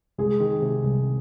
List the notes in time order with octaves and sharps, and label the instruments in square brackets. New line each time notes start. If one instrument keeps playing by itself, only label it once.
[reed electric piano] C2 [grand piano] G#3 G#4
[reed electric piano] D#3
C3
C2